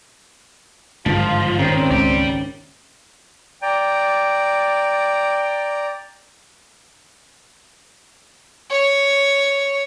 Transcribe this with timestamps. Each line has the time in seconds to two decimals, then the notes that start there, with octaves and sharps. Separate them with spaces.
1.06 G#1 G2 D3 F3 G#3 F4
1.59 D#1 G#1 D#3 C4 C#4
1.91 C#2 D5 E5 G5 A#5 B5
3.62 D5 G5 A#5
8.71 C#5